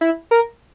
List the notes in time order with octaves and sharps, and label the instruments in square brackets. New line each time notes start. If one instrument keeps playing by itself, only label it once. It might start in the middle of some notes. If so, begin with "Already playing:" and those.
[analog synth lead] E4
A#4